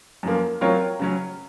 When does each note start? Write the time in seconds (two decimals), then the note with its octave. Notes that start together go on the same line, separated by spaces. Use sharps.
0.23 F#2 F3 A#3
0.61 F#3 C4 F4 A#4 C#5
0.99 C#3 F#3 C#4